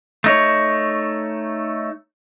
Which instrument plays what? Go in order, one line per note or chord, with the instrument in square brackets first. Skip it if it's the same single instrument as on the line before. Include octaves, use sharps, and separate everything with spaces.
[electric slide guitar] A3 D#4 C#5